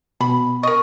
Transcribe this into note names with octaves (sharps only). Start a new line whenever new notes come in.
B2 B5
A#4 D#5 C#6